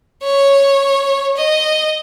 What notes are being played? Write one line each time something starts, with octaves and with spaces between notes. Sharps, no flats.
C#5
D#5